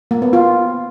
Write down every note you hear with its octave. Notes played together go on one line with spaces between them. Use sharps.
A#3
B3
F4